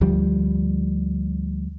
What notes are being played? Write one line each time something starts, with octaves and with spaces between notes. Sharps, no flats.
D2 F3 G3